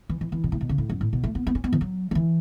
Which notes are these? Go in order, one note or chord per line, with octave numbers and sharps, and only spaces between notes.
E3
E3
E3
B2
A2
B2
C#3
A2
F#2
A2
B2
A3
B3
B3
C#4
B3
E3
F#3
F#3
E3